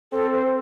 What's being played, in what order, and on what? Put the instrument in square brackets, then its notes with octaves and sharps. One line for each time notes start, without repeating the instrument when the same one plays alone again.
[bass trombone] C4 [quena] A4
[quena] C5